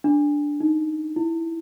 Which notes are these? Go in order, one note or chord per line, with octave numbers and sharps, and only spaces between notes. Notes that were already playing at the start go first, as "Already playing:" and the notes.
D4
D#4
E4